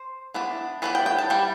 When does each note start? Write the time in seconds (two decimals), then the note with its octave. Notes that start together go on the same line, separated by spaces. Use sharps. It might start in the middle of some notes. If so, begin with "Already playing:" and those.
Already playing: C5
0.34 E3 B3 D4
0.82 E3 B3 D4 B4
0.95 G5
1.06 G5
1.18 A5
1.30 E3 G3 G5